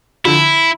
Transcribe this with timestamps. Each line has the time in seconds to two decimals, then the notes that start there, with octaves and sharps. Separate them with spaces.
0.25 D3 F3 E4